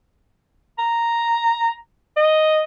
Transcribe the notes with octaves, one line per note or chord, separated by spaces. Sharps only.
A#5
D#5